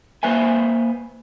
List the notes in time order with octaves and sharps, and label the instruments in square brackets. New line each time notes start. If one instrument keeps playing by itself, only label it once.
[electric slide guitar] A#3 B4 C5 E5 G#5